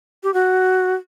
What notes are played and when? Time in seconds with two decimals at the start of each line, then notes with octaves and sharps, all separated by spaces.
0.23 G4
0.34 F#4